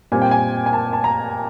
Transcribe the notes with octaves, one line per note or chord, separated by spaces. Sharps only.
A#2 G3 C4 G#5
G5
G#5
G#5
A5
A5
A#5